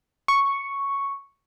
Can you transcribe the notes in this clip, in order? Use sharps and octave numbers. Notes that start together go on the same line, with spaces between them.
C#6